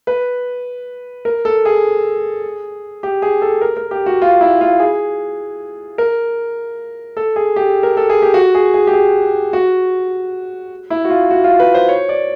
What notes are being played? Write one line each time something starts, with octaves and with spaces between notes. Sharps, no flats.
B4
A#4
A4
G#4
G4
G#4
A4
A#4
A#4
G4
F#4
F4
E4
F4
G#4
A#4
A4
G#4
G4
A#4
A4
G#4
G4
F#4
G#4
G#4
G4
G#4
F#4
E4
F#4
F4
F#4
F4
B4
C5
C#5
D5